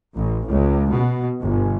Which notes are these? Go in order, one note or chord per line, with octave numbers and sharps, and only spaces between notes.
A1
C#2
B2
G1